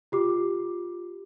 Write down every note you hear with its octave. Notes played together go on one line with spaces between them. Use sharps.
F4 G4 D6